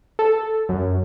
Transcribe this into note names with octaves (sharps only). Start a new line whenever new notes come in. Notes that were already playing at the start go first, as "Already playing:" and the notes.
A4
F#2